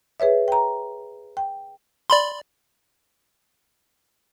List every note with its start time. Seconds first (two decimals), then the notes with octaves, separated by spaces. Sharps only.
0.20 G#4 B4 C#5 E5
0.48 G5 A#5
1.37 G5
2.10 D5 B5 C6